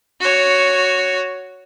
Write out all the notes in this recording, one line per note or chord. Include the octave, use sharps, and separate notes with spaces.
F#4 C#5